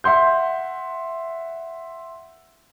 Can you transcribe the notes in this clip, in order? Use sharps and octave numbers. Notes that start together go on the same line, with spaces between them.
E5 F#5 C6 G6